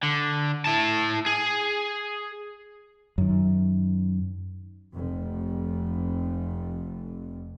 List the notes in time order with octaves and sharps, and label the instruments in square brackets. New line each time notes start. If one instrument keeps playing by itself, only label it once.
[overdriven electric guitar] D3
E4 A5
G#4
[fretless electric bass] F#2 D#3
[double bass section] F1 F2